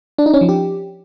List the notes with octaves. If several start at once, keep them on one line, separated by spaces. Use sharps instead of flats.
D4
D#4
C#4
F3
G4